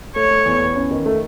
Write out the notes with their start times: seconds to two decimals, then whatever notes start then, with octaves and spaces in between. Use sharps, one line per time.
0.16 A3 C#5
0.31 A3
0.45 E2
0.61 E2
0.76 C#4
0.91 D#3
1.06 A3